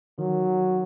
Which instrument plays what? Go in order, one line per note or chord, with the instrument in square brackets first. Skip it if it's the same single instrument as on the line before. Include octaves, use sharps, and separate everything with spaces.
[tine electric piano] D#3 [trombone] F#3